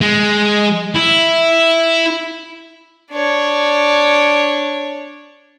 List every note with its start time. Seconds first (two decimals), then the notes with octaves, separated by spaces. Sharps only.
0.01 G#3
0.96 E4
3.12 D4 C#5